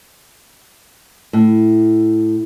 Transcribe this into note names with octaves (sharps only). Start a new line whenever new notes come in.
A2